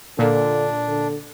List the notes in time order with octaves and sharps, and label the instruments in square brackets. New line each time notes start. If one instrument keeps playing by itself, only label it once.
[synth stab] A#2 [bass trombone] D3 [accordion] D4
[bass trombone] D3